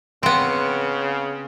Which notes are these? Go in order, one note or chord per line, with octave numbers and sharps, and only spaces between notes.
C#3 B3 C4